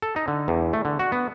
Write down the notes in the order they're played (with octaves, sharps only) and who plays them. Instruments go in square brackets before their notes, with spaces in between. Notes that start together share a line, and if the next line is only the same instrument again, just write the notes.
[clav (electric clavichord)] A4
D#4
D3
E2
A3
D3
F#4
B3